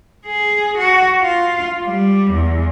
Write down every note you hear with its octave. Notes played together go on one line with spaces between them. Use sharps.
G#4
F#4
F4
G3
E2